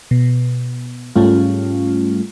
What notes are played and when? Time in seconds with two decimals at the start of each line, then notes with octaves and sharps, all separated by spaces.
0.11 B2
1.16 G#2 G3 A3 C#4 F4